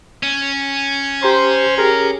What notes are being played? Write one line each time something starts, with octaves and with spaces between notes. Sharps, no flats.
C#4
G4 C5 A#5 C6
G4 G#4 A#4